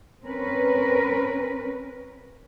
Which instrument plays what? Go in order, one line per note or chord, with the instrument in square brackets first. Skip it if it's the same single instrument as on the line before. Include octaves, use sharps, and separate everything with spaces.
[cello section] C4 C#4 A#4 B4